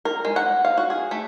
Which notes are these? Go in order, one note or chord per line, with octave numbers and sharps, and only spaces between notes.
A#4
G#3
F#5
F5
F#4
G#4
A3